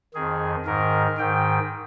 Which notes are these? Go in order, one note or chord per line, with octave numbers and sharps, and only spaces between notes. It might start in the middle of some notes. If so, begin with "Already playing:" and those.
F2 D#3 G#4
G#2 D#3 A#4
G#2 D#3 G5